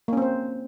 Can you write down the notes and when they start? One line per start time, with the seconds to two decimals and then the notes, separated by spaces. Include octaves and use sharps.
0.08 A#3
0.13 C#4
0.17 C4
0.22 C5